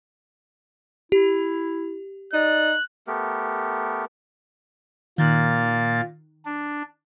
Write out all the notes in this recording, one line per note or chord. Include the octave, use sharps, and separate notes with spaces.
E4 G4
D#4 D5 F#6
A3 B3 G4 A#4
A#2 D#3 A#3 F#6 A6
D4